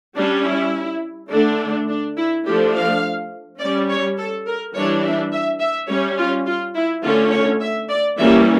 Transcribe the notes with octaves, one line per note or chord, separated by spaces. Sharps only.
G3 C#4 D4
E4
D3 A3 D4
D4
E4
F3 A3 D4 G4
F5
G3 C#4 D5
C#5
A4
A#4
E3 G3 D4 C#5
E5
E5
E5
G3 C#4 C#5
F4
F4
E4
D3 A3 C#4 F4
C#5
E5
D5
E3 G3 A#3 C#4 E5